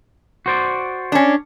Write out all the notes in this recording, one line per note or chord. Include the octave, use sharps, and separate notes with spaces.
F#4 C5 D5
C#4 D4